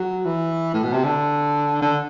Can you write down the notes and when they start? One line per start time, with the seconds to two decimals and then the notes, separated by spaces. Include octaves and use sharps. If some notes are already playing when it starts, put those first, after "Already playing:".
Already playing: F#3
0.25 E3
0.74 A2
0.83 B2
0.93 C3
1.04 D3
1.82 D3